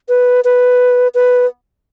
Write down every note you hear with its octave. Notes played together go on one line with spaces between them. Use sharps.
B4
B4
B4